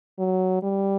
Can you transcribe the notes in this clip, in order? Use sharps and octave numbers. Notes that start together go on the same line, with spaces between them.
F#3
G3